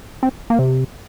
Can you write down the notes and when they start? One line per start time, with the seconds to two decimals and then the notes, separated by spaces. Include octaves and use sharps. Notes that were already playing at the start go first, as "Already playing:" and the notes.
0.23 C4
0.50 A#3
0.59 C3